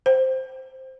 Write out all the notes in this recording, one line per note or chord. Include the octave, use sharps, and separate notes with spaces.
C5